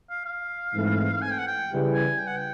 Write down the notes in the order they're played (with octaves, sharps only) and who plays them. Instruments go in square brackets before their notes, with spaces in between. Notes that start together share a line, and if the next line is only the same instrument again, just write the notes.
[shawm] F5
F5
[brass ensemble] G#2 E3 A3 C4
[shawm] G#5
G5
F#5
G5
[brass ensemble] C#3 E3 G3
[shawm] G#5
G5
F#5
G5